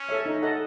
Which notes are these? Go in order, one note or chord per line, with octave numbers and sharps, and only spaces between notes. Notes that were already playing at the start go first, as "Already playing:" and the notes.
Already playing: C#4
A4 C#5 E5
D#4
A4 D#5 F#5